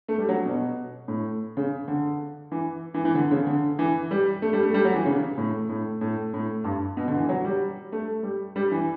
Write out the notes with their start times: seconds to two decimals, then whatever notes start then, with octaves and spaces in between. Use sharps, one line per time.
0.08 A3
0.18 G3
0.28 F#3
0.46 B2
1.08 A2
1.57 C#3
1.88 D3
2.52 E3
2.94 E3
3.05 E3
3.15 D3
3.31 C#3
3.47 D3
3.79 E3
4.11 G3
4.42 A3
4.53 G3
4.63 A3
4.74 G3
4.85 F#3
4.95 E3
5.06 C#3
5.37 A2
5.69 A2
6.01 A2
6.34 A2
6.64 G2
6.97 B2
7.08 D3
7.17 E3
7.29 F#3
7.44 G3
7.92 A3
8.23 G3
8.56 G3
8.71 E3